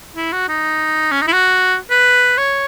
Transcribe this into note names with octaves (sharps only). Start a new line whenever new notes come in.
E4
F#4
D#4
C#4
D#4
E4
F#4
B4
C#5